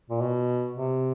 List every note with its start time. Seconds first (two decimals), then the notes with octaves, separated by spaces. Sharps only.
0.10 A#2
0.21 B2
0.76 C3